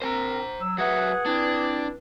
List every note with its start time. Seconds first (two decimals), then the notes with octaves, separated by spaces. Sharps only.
0.02 C4 A#4 C5 G#5 A#5
0.61 F#3 E6
0.78 F#3 G#4 B4 E5 F#5
1.26 C4 D4 E4 D5